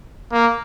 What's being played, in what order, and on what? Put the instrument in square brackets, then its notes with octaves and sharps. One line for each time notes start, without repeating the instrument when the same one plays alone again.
[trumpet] A#3